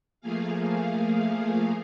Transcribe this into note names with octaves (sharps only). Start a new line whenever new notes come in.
F3 A3 A#3 G#4 F5